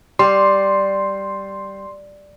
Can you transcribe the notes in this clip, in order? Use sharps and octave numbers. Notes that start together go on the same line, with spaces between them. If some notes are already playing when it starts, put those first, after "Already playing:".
G3 C6